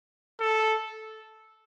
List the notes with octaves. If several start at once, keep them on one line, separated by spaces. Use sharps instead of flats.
A4